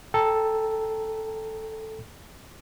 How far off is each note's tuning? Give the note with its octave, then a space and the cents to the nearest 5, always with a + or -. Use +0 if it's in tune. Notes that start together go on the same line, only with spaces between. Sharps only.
A4 +0 G5 +10 A#5 +0